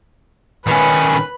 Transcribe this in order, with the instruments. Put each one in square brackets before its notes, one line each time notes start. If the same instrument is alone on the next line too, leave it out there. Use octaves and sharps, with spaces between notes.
[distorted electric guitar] D#3 C#4 [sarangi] B4